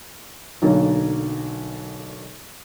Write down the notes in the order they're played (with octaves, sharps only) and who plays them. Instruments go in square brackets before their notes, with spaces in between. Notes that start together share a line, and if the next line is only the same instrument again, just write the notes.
[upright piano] B1 B2 D3 A#3